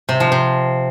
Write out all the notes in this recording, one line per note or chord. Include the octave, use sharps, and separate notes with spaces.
C3
F3
C3